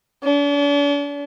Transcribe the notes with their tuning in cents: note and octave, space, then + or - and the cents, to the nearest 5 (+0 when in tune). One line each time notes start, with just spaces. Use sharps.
D4 -45